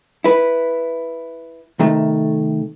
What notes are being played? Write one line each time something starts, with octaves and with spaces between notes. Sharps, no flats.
E4 B4
C3 D#3 A3